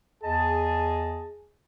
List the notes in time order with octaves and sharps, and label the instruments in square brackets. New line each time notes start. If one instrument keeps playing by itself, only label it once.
[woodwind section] E2 D#5 A5 [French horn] G#4